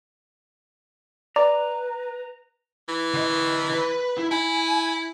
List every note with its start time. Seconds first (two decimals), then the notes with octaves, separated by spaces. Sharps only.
1.36 B4 D5 A#5
2.89 E3
3.14 D3 D#5
3.74 B4
4.17 E4
4.31 E4 G#5